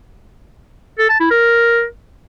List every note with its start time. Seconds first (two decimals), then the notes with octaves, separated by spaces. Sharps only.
0.99 A4
1.09 A5
1.20 E4
1.31 A#4